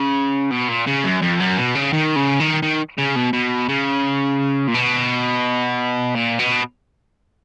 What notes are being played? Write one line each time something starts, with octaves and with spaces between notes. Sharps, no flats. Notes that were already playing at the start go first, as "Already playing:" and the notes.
Already playing: C#3
B2
A#2
C#3
F#2
F2
F#2
B2
C#3
D#3
C#3
D#3
D#3
C#3
B2
B2
C#3
A#2
B2
A#2
B2